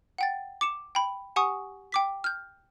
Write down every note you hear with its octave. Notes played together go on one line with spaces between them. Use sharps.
F#5 G5 A6
D6 C#7 E7
G5 B5
G4 F#5 G#5 C#6 D#6
G5 D6 B6
F6 G6